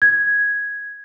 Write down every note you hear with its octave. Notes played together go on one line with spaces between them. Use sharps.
G#6